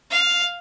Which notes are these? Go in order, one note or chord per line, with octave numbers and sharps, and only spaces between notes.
F5